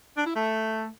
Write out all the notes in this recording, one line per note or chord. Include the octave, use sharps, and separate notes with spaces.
D4
E4
A3